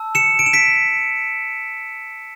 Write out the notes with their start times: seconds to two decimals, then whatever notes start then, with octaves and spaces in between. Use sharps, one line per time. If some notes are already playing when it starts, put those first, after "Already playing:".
Already playing: A5 E6
0.15 C#7 E7
0.39 D7
0.46 E7
0.53 B6 D7